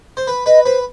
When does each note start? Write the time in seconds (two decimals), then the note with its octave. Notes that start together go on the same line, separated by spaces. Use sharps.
0.17 C5
0.27 B4
0.46 B4 D#5
0.64 B4 C5